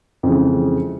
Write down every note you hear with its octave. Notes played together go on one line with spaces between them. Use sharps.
F2 C#3 E3 G#3